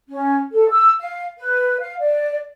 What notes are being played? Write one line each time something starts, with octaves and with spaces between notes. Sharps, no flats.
C#4
A4
E6
F5
B4
F5
D5